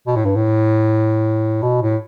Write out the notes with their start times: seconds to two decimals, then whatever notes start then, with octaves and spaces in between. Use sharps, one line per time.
0.07 B2
0.16 A2
0.25 G2
0.36 A2
1.63 B2
1.82 A2